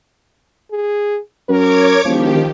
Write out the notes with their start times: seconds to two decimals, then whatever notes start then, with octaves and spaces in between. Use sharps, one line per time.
0.72 G#4
1.49 F#2 A#4 C#5 D6 G#6
2.05 E1 D#3 F3 G4